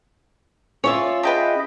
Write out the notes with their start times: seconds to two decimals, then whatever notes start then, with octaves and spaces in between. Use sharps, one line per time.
0.84 C#4 F4 C#5 D5 E5
1.23 G#4 B4 D#5 E5 G5 A5